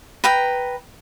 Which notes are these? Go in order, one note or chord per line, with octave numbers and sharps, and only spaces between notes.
B4 G5 A#5